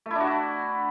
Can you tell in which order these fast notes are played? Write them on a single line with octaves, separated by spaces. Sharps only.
A3 E4 D4 F#4